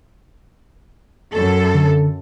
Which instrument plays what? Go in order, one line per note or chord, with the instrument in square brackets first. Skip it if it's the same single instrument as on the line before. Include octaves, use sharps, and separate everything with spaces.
[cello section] F#2 A4
[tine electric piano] D3